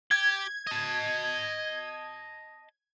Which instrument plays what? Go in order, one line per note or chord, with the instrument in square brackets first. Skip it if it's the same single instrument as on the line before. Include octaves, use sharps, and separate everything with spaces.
[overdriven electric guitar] G4 [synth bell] G#6
[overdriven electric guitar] D#5 A5